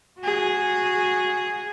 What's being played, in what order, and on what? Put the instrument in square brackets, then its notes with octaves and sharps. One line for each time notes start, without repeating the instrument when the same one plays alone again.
[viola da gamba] F#4 G#4